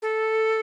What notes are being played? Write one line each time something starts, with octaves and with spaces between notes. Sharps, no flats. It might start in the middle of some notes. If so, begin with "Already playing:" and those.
A4